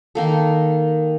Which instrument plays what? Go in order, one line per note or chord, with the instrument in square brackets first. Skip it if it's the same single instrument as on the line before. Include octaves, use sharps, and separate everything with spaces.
[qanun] D#3 A#3 A4